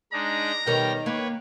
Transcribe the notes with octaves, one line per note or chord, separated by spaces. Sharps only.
G#3 D4 D#4 A#5
B2 D#3 G3 A#4 C#5 G5 F6
A#3 B4 C#5